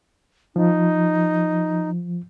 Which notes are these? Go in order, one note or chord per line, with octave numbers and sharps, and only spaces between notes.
F3 D#4